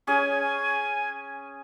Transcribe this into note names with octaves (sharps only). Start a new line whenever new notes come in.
C#4 G#4 G#5